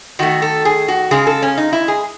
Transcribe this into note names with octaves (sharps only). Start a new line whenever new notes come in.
D#3 A3 F#4
A4
G#4
F#4
C#3 G#3 G#4
A4
C#4
D#4
E4
G#4